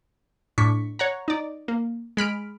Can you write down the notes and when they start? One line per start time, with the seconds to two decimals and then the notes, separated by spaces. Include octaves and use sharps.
0.58 A2 D4 C#6 B6
0.99 C#5 F#5 A#5
1.28 D#4 D5
1.68 A#3
2.17 G#3 B5 F6 D7